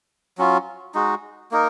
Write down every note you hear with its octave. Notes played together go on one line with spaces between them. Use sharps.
F#3 C#4 F4
G#3 D#4 F#4
A#3 D#4 A#4